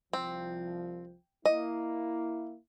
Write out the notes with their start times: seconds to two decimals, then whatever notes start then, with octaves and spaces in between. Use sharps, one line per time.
0.13 C2 F3 C4
1.46 A#3 E4 D#5